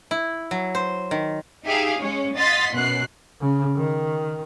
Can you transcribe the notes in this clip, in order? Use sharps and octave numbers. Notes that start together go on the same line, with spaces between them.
E4
F#3
C5
D#3
D#4 G4 G#4 E5 F5
G#3 C#4 C#5
D#5 F5 F#5 C6 A6 B6
F#2 B2 F#6 C7
C#3
D#3